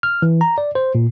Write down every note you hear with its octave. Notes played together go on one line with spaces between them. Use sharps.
F6
E3
A#5
D5
C5
A#2